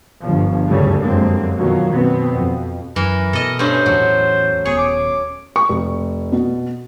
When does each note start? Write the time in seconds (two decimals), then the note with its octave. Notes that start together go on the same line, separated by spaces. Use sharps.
0.20 G1 F3
0.68 F#1 D2 G2 C#3 G3 A3
1.04 F1 F#2 D3 G#3 A#3 C4
1.54 F#2 B2 D#3 F3 F#3
1.92 B2 B3 C4
2.32 F2
2.96 F#2 E3 A#4
3.33 B2 A4 D#5
3.59 G2 A3 C#4 C5
3.86 E2 A2 F#3
4.65 D#1 B3 G#4 C#5
4.78 D6
5.56 C#6
5.69 F1
6.32 B2